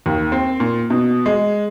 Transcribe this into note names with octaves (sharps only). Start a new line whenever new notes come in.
D#2
C4
A#2
B2
G#3